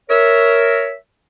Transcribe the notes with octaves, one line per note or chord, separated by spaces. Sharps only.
A#4 C#5 E5